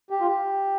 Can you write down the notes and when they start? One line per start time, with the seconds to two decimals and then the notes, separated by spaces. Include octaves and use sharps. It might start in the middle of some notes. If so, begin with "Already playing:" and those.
0.10 G4
0.21 F4
0.27 G4